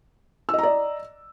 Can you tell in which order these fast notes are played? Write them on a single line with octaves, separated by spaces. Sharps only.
E6 D#5 A#5 D5